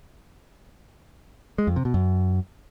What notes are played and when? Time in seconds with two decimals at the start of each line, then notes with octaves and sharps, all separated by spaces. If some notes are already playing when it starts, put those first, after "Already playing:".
1.58 G#3
1.67 F2
1.76 C3
1.85 B2
1.94 F#2